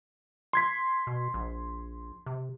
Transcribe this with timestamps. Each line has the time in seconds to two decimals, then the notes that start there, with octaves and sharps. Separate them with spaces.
0.53 C6 G#6 B6
1.07 B2
1.34 A#1
2.26 C3